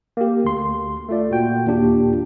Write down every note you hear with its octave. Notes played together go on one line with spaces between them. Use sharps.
A#3 G4
D2 C6
A3 F4 D5
A#2 F#4 G5
D#2 A#2 D4 G4